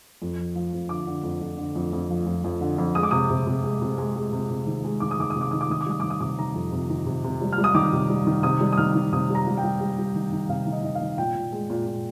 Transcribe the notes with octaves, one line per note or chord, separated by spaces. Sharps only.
F2
F3
F3
F2
D3 D6
D3
F2
F2
D3
F2
F2
F3
F2
F2
D3
F2
G#3 D#6
D6
C3 D#6
C3
C3
G#3
C3
G#3
G#3
C3
C3
D#3
G#3
D#3 D6
D#6
D#3 D6
D#6
C3
D6
D#3 D#6
D6
D#3 D#6
D6
G3 D#6
D#3 D6
D#6
C3 D6
D#3 A#5
F2
C3
D#3
C3
C3
G3
F6
G3
D#6
D#3 D6
C3
G3
D#3
C3 D#6
G3
D#6
D#3 F6
D#3
C3 D#6
G3 A#5
G3
G5
G3
G3
G3
D#3
D#3
C3 F5
D#3
D#5
D#3 D#5
F5
D#3
A#2 G5
A#2
G#3
A#2
A#2